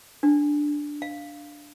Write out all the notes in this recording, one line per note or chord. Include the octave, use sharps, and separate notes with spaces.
D4
F5